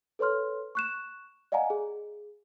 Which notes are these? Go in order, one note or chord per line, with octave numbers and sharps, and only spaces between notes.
A4 B4 C#5 C6 F6
C#6 F#6 E7
D5 D#5 F5 F#5 G#5 A#5
G#4